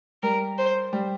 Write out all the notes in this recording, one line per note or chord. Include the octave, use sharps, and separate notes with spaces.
G3 A#4
C5
G3